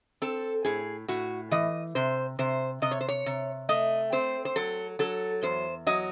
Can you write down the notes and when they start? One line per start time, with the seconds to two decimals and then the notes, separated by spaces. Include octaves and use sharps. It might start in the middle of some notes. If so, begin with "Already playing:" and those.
0.22 C4 A4
0.65 A2 G#4
1.08 A2 F#4
1.51 E3 D#5
1.95 C3 C5
2.39 C3 C5
2.82 C3 D#5
2.91 C#5
3.01 C5
3.09 C#5
3.26 C3
3.69 A3 D#5
4.12 C4 C5
4.45 C5
4.56 F#3 A4
4.99 F#3 A4
5.43 E2 C5
5.87 F#3 D#5